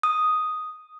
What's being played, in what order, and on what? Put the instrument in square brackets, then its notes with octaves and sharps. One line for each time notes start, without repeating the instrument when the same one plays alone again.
[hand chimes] D#6